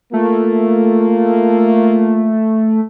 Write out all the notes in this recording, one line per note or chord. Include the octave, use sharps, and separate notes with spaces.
A3 A#3 F4